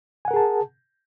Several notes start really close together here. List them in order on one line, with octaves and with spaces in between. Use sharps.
G#5 F#5 A#4 G#4 A5